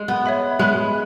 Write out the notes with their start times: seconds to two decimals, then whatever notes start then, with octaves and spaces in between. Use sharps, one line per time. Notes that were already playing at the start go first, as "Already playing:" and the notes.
Already playing: G#3
0.08 B3
0.26 C#5 E5 B5
0.59 G#3 E5 B5 F#6